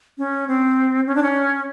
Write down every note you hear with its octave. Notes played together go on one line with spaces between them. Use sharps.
C#4
C4
C#4
D4
C#4